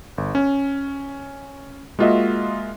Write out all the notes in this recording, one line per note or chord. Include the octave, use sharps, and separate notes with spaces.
G1
C#4
G#3 A#3 F4 F#4 D#5 E5